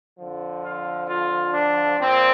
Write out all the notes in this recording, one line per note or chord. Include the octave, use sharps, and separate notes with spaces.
F2 D3 F3
F4
F4
D4
A#2 F3 C4